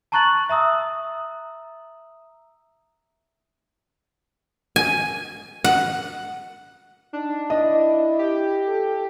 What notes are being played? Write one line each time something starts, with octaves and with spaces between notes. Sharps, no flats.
A5 A#5 C#6 F#6 A6 F#7
E5 A#5 D#6 E6
G#5
F#5
D4 D#4
E4 D#5
G4
A4